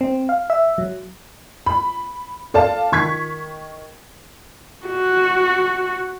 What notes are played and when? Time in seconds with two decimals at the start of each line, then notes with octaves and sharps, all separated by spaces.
0.01 C4
0.29 F5
0.50 E5
0.78 F#3
1.66 B5
2.54 A4 D5 F5 A5
2.92 D#3 C#6 G#6 B6
4.87 F#4